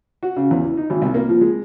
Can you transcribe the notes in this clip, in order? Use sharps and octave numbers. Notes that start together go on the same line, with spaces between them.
F#4
C#3
E2
E3
D#4
G#1
C2
A#3
F3
G#3